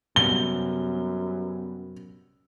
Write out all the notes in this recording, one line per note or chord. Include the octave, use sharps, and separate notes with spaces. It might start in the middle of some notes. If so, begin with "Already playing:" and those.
F#2 C3 G3 B3 G7